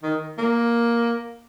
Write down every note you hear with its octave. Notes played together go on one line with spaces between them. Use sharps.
D#3
A#3